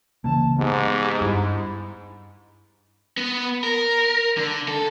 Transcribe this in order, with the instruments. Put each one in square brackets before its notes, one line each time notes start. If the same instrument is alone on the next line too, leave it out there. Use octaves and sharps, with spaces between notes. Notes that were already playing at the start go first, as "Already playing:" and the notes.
[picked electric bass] C#3 E3 A#3 [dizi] A5
[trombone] G#2 [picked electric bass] B3 [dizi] G4
[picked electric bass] G2 [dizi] E4
[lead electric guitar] B3
A#4
D3
A4